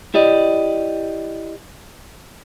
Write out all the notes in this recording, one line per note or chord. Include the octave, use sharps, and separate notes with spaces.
E4 G4 D5 D#5